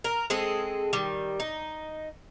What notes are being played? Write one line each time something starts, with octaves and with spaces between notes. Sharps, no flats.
A#4
G#3 C4 G#4 A4
D#3 G3
D#4